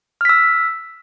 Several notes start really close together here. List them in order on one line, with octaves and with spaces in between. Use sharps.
F6 B6 E6